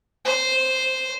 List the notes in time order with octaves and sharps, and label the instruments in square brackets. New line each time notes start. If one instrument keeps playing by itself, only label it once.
[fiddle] C5